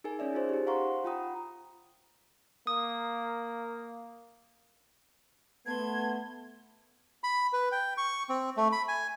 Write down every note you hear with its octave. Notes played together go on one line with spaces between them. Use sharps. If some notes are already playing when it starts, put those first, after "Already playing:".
D#4 G#4 A#4 G#5
C#4 C#5 D5 E5
D#4 F4 G#4 C5
D#4 G4
C5 F5 F#5 A#5 C6 C#6
F4 F#5 G5 A#5 B5 D#6
A#3 D#6
A3 B3 A5 C6 G#6
B5
B4
G5
C#6
C4
A3
B5
G#5